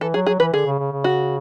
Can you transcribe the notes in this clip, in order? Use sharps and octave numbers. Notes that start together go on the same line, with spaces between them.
E3 A4
F#3 G#4
F#3 G#4
E3 B4
D3 G#4
C#3
C#3
C#3
F#4